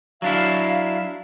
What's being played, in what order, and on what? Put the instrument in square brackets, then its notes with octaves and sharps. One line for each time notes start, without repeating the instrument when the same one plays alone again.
[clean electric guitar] F#3 D4 E4 [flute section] F5